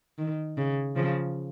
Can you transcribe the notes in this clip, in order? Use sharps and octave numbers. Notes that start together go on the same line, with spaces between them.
D#3
C#3
C#3 F3